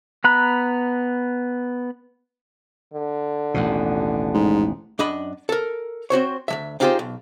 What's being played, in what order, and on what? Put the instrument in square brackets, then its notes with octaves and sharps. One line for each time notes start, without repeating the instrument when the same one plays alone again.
[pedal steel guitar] B3 A#5 B5 F#6
[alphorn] D3
[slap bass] A1 D#2 B2
[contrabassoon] G#2
[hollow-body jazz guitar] F#2 D4 D#5 B5
A4 A#4
C4 F#4 C5 C#5
D2 F3 E5
C4 D#4 F4 G4 G#4 C5
B1